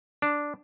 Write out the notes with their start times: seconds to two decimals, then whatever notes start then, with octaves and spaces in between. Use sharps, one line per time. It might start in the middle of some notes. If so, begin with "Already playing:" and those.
0.22 D4